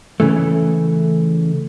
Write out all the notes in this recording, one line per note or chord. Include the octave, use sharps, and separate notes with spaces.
C#3 E3 A3